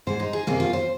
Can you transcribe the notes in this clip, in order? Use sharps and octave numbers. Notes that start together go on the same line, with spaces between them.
G#2 G#3 C5
D#4
G#4
F2 C3 D#3 A#3 G#4
F4
C5